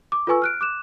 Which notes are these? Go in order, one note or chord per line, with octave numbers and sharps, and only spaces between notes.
D6
F4 A4 B4 G#5 C#6 E6
F6 F#6 D7
D6 F#6 E7